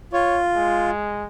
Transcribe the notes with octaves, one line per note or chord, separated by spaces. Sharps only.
F4 C#5
G#3